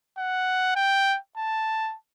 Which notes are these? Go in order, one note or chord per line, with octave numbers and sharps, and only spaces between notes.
F#5
G5
A5